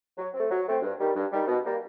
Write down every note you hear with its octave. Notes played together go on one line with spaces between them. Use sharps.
F#3
A3 C4
F#3
A3 C4
G2
D#3 G3
G2
D#3 G3
B2
G3 A#3